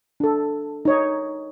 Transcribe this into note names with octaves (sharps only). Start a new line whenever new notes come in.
D4 A4
D#4 C#5 D#5